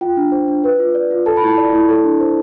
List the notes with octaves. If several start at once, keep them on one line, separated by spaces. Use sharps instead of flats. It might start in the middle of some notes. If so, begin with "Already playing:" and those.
F4 G5
D4
C5
D4
B4
F4
D5
F4
A4 A5
B5
E4 A5
D5
E4
A4
D4
C5